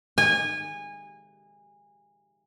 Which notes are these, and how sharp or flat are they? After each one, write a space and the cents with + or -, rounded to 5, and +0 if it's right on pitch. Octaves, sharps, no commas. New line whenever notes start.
G#5 -25